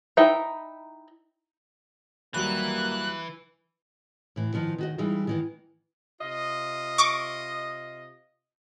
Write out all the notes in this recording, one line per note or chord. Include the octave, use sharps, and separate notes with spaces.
D#4 E4 E5 G5
D#2 E3 F#3 G3 A#3 F#6
A2 E3
D#3 F3 B3
D#3 F#4 D#5
E3 G3 G#3 D#4 F4
D#3 E3 B3
C3 F4 D#5
C#6 D6